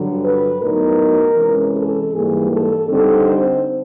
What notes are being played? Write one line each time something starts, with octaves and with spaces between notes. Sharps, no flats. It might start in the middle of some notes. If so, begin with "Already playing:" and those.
Already playing: G2 D3 F#3
B4
A2 F#3 B3 D#4 A#4
C3 E3 G#3 C#4
A4
G#2 E3 G3 A#3 G#4
A4
D3 G3 C4 D#4 A4
C5